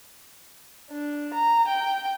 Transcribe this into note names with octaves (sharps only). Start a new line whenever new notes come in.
D4
A#5
G5